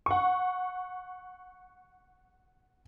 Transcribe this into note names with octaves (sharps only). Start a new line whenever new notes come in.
F#5 C#6